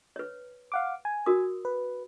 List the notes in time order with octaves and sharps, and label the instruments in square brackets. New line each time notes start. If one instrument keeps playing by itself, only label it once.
[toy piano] B4 C#5
[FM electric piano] F5 F#5 D6
G#5
[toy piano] F#4 A#4 D#6
[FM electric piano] B4